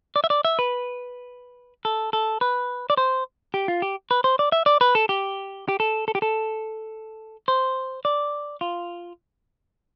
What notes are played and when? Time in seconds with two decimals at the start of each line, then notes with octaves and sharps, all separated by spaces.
0.16 D5
0.24 E5
0.30 D5
0.45 E5
0.59 B4
1.85 A4
2.13 A4
2.41 B4
2.90 D5
2.97 C5
3.54 G4
3.68 F4
3.82 G4
4.11 B4
4.24 C5
4.39 D5
4.52 E5
4.66 D5
4.81 B4
4.95 A4
5.09 G4
5.68 G4
5.80 A4
6.08 A4
6.15 G4
6.22 A4
7.48 C5
8.05 D5
8.61 F4